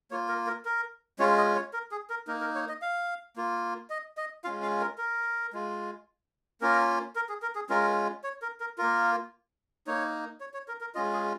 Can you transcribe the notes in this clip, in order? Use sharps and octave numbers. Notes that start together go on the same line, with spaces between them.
A#3 F4 C#5
A#4
A#4
A#4
G#3 C#4 F4 C#5
D#5
C#5
A#4
G#4
A#4
A#3 D#4 A#4
A#4
C#5
D#5
F5
A#3 F4
D#5
D#5
G#3 C#4 F4 F5
F5
A#4
A#4
G#3 F4
A#3 C#4 F4 A#4
A#4
G#4
A#4
G#4
G#3 C#4 F4 A#4
C#5
A#4
A#4
A#3 F4 A#4
A#3 D#4 C#5
C#5
C#5
A#4
A#4
G#3 C#4 F4 D#5
G#4